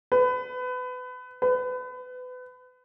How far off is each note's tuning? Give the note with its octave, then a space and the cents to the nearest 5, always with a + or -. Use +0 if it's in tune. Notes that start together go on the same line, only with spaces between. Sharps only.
B4 +25
B4 +30